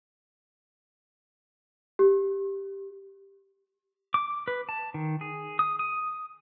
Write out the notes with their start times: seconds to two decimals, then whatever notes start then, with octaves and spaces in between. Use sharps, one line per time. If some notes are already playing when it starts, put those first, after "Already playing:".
1.99 G4
4.14 D6
4.48 B4
4.69 A5
4.94 D#3
5.21 G#4
5.59 D#6
5.79 D#6